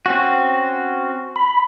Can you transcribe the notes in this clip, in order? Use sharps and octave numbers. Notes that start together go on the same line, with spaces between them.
C4 C#4 F#4
B5